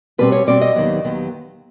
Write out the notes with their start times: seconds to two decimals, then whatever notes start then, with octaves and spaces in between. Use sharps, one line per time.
0.18 B2 G3 C4 B4
0.32 C#5
0.47 B2 G3 C4 D5
0.61 D#5
0.75 D#2 D#3 F#3 B3
1.04 D#2 D#3 F#3 B3